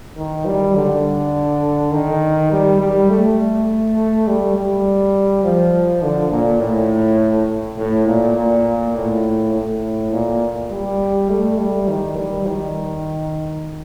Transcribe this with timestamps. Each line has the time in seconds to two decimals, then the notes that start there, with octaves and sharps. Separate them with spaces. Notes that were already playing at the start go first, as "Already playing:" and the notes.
0.17 D#3
0.46 G3
0.75 D3
1.92 D#3
2.51 G3
2.80 G3
3.09 A3
4.27 G3
4.56 G3
5.44 F3
6.03 D3
6.31 A#2
6.60 A2
7.78 A2
8.07 A#2
8.37 A#2
8.96 A2
9.53 A2
10.12 A#2
10.71 G3
11.30 A3
11.59 G3
11.88 D#3
12.17 G3
12.47 D#3